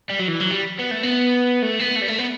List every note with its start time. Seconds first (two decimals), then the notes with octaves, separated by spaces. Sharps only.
0.09 G3
0.19 F#3
0.28 E3
0.40 F#3
0.51 G3
0.79 B3
0.91 A3
1.03 B3
1.63 A3
1.80 B3
1.96 A3
2.02 G3
2.08 A3
2.19 B3